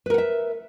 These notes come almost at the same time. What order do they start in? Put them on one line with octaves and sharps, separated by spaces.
B4 A#4 F#5 E5